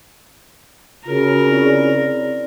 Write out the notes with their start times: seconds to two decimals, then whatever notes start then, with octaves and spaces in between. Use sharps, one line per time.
1.05 C#3 F4 F#4 A#4
1.47 C4 E4 D5